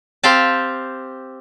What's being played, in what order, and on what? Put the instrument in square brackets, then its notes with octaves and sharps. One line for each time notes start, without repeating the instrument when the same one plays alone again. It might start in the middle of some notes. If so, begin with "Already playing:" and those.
[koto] C4 G4 F5 G5 A5